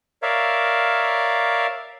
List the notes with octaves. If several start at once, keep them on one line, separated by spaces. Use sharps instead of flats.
A#4 C#5 D5 E5 F5